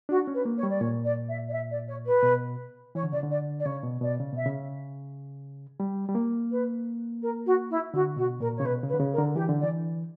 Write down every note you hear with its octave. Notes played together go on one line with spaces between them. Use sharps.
D4 F#4
C#4
B4
A#3
C#5
G3
D5
A#2 C#5
D5
E5
D5
E5
D5
C#5
B4
B2
E3 C#5
D3
C#3 D5
D3
D5
D5
C#3 C#5
B2
B2 D5
C#3
B2 E5
C#3
G3
G3
A#3
B4
A#4
F#4
E4
D3 F#4
B2 F#4
A#2 A#4
C#5
C#3
B2 B4
C#3
B4
D3
C#3
A#4
D3
E3 G4
D3
D5
E3